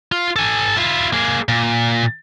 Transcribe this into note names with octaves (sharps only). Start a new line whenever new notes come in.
F4
A4 G#5
E4 F4
A#3 G#4
A#2